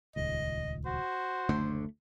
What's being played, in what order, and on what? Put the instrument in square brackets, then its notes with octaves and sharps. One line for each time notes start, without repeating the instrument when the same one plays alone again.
[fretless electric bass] D#1 C#2 [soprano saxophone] D#5
[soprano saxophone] F#4 [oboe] C5
[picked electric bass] F#1 D2 D3 [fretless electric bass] A3